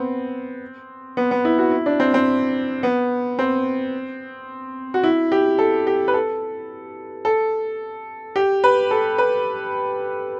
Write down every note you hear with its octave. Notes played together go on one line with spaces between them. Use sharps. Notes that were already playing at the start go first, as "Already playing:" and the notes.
Already playing: B3 C4
B3
B3
E4
F#4
E4
D4
C4
C4
B3
C4
F#4
E4
G4
A4
G4
B4
A4
A4
G4
B4
A4
B4